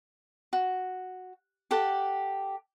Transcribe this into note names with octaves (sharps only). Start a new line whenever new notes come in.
F#4
G4 A4 F#5 D6